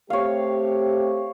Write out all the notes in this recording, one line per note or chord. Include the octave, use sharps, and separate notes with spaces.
A3 C4 G4 C#5 F5